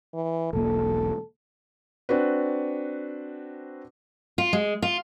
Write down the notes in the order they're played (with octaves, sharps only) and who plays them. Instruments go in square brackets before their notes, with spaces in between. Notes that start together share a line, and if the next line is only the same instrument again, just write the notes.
[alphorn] E3
[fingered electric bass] E1 B1 A#3 [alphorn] A4
[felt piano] C4 D4 F#4 B4
[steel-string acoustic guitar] F4
G#3
F4